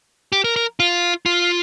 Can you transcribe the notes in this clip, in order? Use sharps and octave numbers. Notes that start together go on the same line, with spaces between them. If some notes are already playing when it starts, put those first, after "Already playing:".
G4
A#4
A#4
F4
F4